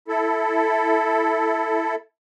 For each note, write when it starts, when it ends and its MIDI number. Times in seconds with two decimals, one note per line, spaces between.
0.08 1.95 64
0.08 1.95 69